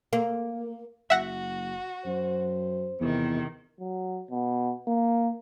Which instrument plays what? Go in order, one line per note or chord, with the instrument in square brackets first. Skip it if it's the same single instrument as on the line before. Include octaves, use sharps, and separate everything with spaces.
[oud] A#3
[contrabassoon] F#1 [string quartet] F#4 [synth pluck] E5 F#5 A#6
[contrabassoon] F#2 [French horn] C5
[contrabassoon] E2 [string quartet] C3 D#3
[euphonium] F#3
B2
A#3